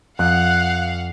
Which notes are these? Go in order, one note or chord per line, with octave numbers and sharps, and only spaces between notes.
F2 F5 F#5 F#6